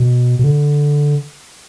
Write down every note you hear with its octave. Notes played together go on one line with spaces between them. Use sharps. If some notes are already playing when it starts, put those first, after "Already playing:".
Already playing: B2
B2
D3